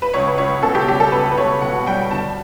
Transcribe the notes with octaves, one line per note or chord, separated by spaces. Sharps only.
B4
C#2 C#5
B4
C#2 C#5
B2 A4
G4
G3 G4
A4
C#2 B4
B4
C#2 C#5
B2 F#5
G3 G5
D2 A5